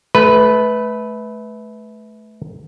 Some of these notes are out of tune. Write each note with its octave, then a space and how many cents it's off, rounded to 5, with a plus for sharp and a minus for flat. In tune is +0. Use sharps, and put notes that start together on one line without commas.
A3 -25 B4 +0